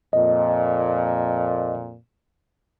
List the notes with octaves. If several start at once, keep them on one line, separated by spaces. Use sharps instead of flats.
F2 A#2 D#5